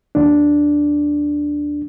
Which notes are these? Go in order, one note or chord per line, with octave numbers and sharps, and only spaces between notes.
D#2 D4